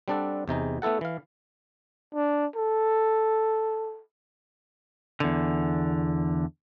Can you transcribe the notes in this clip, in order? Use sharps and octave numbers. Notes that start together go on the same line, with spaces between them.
G3 C4 D4 A4 D5 F#5
E2 C3 D#4 G#4
A3 B3 E4 A4 F#5
E3 F5
D4
A4
E2 D3